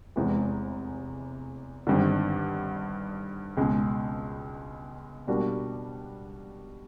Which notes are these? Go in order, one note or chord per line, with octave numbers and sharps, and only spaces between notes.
F1 E2 C3 E3 G#3
G#1 G2 D3
C#2 B2 G#3
B2 G3 A#3 D4 F#4